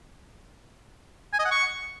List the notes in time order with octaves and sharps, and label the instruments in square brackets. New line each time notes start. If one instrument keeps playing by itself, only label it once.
[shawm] G#5
D#5
F#5
C#6